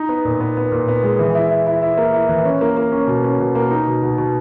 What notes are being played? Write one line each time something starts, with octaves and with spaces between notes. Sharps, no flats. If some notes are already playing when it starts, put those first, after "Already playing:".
Already playing: D#4
B3
A#2
B3
B3
A#2
B3
G#3
E3
E4
E4
E4
E4
A#3
E4
E3
C#4
A#3
A#3
C#4
B2
C#4
B2
A#3
D#4
B2
B2
B2